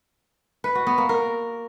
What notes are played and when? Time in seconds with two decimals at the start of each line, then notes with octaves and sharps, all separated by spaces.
0.64 B4
0.75 F#4
0.87 B3
0.98 A#3
1.09 A#4